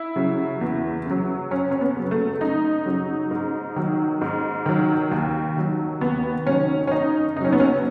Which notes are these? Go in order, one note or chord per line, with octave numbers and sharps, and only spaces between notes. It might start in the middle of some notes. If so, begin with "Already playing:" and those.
Already playing: E4
C#3 F#3
E2
C#3 F#3
F#2 C#4
C#4
B3
C#3 F#3
A3
F#2 D#4
C#3 F#3
G#2
D#3 F#3
G#2
D#3 F#3
D#2
D#3 F#3
D#2 B3
D#3 F#3 C#4
C#4
F#2 D#4
C#3 F#3 C#4 D#4
B3
C#4